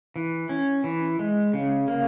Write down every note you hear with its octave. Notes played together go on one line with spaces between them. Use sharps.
E3
C#4
E3
G#3
C#3
A#3